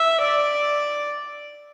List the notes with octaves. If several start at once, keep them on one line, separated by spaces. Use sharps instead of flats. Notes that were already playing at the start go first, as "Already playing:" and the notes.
Already playing: E5
D5